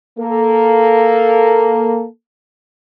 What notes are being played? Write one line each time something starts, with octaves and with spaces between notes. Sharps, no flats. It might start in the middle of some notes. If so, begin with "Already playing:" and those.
A#3 A4